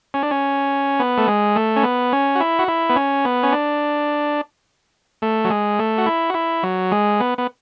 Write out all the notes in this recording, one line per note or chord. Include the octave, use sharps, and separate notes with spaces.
C#4
D4
C#4
B3
A3
G#3
A3
C#4
B3
C#4
F#4
E4
F#4
E4
B3
C#4
B3
C#4
D4
A3
F#3
G#3
A3
F#4
E4
F#4
E4
F#3
G#3
B3
B3